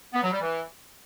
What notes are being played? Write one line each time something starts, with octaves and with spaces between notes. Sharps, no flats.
B3
F#3
G3
E3